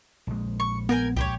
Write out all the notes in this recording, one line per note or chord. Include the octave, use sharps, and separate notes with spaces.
A#1 G#3
C#6
B3 A#4 G5 G#5
C#2 G4 C5 C#5